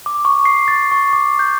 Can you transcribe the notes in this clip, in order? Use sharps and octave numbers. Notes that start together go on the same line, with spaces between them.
D6
C#6
C7
A6
C#6
D6
G6